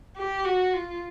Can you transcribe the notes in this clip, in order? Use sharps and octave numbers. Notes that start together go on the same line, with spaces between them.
G4
F#4
F4